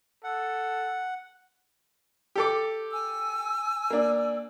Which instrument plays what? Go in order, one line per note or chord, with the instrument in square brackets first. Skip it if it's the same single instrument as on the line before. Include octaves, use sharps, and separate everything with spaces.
[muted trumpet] A4 [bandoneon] F#5
[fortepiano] G4 A4 D6
[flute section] G#5 E6
[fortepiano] A#3 D4